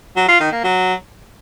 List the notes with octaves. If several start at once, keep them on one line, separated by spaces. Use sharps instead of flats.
F#3
F4
D#3
A#3
F#3